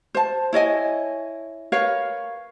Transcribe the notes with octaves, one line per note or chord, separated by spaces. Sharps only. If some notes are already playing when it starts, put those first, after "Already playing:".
C5 A5
E4 C#5 D#5 G#5
A#4 B4 C#5 F5